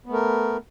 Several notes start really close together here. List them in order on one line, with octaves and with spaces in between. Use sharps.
B3 A3 A#4